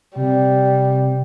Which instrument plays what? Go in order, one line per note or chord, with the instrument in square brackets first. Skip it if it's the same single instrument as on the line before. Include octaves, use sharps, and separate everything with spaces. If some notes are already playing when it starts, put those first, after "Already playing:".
[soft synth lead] C3 [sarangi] G3